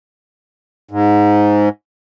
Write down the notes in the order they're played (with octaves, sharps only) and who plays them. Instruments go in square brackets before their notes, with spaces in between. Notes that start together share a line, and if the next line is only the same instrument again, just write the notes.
[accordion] G#2